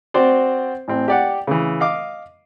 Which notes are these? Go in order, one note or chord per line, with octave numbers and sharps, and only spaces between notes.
C4 F#4 C5 D5
A1 C4
G4 D5 F#5
C#3 E3
D#5 F5 D6